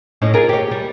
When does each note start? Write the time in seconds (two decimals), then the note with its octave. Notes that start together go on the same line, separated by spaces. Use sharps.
0.22 A2 C#4 D#4
0.34 F4 G#4 A#4
0.49 G4 C#5
0.71 G3